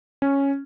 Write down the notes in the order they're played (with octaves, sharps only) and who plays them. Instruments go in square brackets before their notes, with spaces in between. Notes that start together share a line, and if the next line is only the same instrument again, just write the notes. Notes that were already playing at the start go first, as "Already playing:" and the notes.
[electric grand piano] C#4